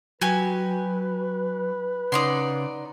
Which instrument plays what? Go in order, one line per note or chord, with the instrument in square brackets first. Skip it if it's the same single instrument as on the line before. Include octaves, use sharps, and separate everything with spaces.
[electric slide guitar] F#3 [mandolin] F#4 G4 G#5 [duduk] B4
[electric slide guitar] C#3 C#5 F#5 [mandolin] D#4 D5 C6